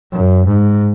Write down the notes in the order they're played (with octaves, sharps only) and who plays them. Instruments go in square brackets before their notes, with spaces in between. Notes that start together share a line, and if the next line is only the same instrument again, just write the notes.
[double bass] F#2
G#2